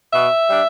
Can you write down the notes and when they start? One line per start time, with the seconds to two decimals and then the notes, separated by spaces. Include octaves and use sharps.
0.13 B2 E5
0.50 G3 D4